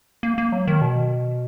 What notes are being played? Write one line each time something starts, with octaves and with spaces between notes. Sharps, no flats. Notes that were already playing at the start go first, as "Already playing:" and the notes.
A#3
A#3
F#3
D#3
B2